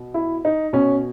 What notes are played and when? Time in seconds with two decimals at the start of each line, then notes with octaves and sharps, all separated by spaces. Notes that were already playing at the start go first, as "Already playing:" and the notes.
Already playing: B2
0.14 E4
0.45 D#4
0.73 B2 C#4